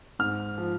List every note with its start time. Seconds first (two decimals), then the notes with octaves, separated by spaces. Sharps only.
0.19 G#2 F6
0.58 F3